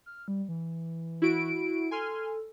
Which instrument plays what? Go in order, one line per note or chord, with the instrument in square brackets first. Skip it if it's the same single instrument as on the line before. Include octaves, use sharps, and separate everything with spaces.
[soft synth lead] F6
G3
E3
[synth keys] E4 F#4 D7
[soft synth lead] A4 [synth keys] G#5 C6 F6